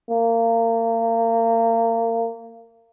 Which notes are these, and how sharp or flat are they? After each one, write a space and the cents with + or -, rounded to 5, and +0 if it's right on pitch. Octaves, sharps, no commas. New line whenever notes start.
A#3 -30